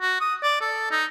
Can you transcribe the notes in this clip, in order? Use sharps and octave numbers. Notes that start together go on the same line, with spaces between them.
F#4
D#6
D5
A4
D#4